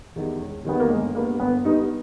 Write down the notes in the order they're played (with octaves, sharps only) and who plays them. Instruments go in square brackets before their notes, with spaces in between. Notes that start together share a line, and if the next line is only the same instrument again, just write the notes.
[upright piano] E2 D#3 G3
E1
[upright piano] E2 D#3 G3 [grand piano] B3
[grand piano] A#3
[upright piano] G1 [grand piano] G#3
[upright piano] G2 G3 B3 [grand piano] A#3
[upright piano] G1 [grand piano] B3
[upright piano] G2 G3 B3 [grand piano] D#4